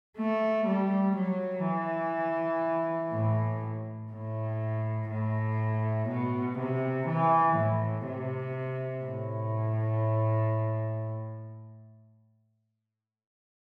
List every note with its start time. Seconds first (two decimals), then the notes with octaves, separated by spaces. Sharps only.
0.18 A3
0.67 G3
1.16 F#3
1.66 E3
3.13 A2
4.12 A2
5.10 A2
6.09 B2
6.58 C3
7.08 E3
7.57 A2
8.07 C3
9.04 A2